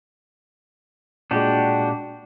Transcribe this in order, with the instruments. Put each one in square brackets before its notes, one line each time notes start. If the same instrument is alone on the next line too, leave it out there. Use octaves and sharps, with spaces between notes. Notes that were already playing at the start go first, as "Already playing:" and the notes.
[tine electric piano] A#2 G#3 [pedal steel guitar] D4 F#4 G4